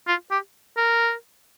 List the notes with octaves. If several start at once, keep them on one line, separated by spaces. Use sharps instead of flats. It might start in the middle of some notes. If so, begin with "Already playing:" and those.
F4
G4
A#4